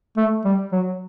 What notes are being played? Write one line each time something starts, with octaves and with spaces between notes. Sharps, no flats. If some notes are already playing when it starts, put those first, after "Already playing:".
A3
G3
F#3